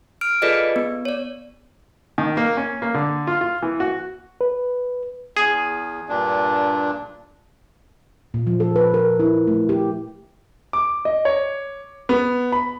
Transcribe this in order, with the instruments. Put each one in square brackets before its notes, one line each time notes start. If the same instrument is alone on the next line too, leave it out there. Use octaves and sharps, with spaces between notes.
[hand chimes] F6 D7
F4 G#4 A4 B4 D5 D#5
B3
C#5 D5
[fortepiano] D#3
A#3
C#4
A#3
D3
F4
F4
E3
F#4
[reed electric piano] B4
[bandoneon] E2 [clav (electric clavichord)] G#4
[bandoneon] G2 A#2 D4
[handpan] A#2
F3
A4
B4
A#4
E4
A3
G4
[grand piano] D6
D#5
C#5
B3
B5